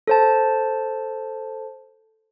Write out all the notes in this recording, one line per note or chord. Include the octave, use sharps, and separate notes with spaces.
A4 C5 A5